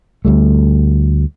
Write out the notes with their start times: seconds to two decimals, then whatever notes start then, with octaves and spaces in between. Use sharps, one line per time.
0.25 D2 G3 A3